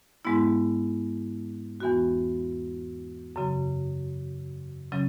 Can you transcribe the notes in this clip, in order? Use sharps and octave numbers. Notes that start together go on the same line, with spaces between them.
G#2 G#3 B3 E4
E2 E3 B3 F#4
F#2 C#3 F#3
C#3 F#3 C#4